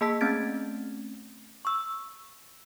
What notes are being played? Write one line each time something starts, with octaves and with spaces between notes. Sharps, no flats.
A#3 G#4 D#5 A5 E6 B6
A3 C4 C#4 G#6 A6 D7
C#6 E6